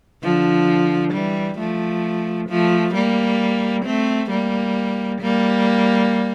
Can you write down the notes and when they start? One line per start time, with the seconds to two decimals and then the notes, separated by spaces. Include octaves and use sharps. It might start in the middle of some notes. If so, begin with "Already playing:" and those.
0.23 D3 F3
1.13 E3 G3
1.58 F3 A3
2.49 F3 A3
2.94 G3 A#3
3.85 A3 C4
4.30 G3 A#3
5.21 G3 A#3